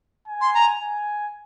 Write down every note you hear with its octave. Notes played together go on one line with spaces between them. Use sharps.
G#5
C6
A#5
G#5